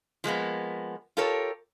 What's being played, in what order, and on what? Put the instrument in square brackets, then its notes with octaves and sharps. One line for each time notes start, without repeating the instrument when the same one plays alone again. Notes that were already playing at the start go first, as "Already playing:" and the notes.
[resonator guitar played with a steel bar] F3 G#3 A#3 B3
F4 G4 A4 A#4 C#5